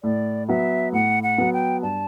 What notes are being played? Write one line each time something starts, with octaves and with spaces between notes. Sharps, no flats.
A2 D5
F#3 B3 E5
A2 F#5
F#5
F#3 B3
G5
G2 A5